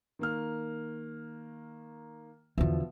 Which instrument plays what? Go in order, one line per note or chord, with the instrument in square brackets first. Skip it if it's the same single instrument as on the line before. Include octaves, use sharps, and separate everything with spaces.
[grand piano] D#3 A#3 F6
[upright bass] E2 D3 [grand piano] B2 F3 E5